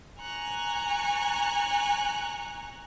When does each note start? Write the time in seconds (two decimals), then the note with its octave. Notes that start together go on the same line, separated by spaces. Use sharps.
0.20 G#5 A#5 C#6 F#6